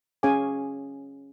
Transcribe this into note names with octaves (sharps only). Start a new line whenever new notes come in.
C#4 G#4 C#5 F5 G#5 D6